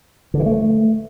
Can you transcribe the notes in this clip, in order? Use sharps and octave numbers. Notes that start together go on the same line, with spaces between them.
D3
E3
A3